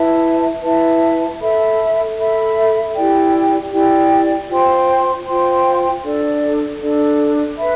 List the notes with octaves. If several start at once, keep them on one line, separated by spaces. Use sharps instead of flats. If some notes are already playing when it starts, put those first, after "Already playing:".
Already playing: E4 B4 E5 A5
E4 B4 E5 A5
A4 E5 B5
A4 E5 B5
E4 G4 D5 G5
E4 G4 D5 G5
F4 C5 G5 C6
F4 C5 G5 C6
D4 A4 D5
D4 A4 D5
B4 E5 B5